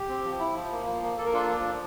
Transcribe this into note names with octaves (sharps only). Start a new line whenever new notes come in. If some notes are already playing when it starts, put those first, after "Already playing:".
Already playing: G4
C4
F3
E4
F3
A#3
F3
A#3
A#3 A4
A#4
D4 F4 A4
F3
F3